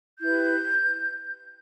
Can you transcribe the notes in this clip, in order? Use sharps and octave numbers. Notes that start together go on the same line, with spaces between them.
E4 G4 B4 G6